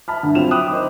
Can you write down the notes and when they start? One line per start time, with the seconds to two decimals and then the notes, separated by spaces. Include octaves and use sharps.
0.08 E5 A5 B5 F6
0.23 G2 D3
0.35 F#3 C4 F4 E5 E7 F7
0.51 G5 B5 D6 D#6 F#6
0.71 D#4 C5